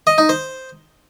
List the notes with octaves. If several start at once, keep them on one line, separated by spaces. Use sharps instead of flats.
D#5
D#4
C5